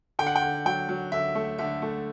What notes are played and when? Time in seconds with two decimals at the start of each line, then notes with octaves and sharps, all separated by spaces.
0.19 D3 G5
0.27 F#5
0.36 G5
0.42 D3
0.66 F#3 G5
0.89 F#3
1.12 D3 E5
1.35 A3
1.58 D3 E5
1.82 A3